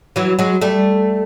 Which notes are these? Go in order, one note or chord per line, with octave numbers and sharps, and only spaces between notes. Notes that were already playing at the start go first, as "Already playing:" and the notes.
E3 F#3
F#3 G#3
G3 A3